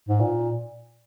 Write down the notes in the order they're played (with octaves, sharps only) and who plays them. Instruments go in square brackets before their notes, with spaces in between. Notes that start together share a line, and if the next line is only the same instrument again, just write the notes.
[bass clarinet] G#2
A#2